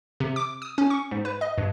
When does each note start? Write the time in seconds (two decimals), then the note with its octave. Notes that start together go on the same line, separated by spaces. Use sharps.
0.20 C3
0.36 D6
0.62 D#6
0.78 C#4
0.90 C#6
1.11 G#2
1.25 B4
1.41 D#5
1.58 G2